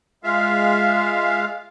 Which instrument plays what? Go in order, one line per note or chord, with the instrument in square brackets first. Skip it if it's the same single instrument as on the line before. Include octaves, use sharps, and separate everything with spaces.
[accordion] G#3 F5 [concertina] F4 E5